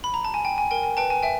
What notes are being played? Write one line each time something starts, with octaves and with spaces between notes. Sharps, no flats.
B5
A#5
A5
G#5
G5
G#5
A#4 G5
G#5
B4 G5 A5
G#5
E5 G5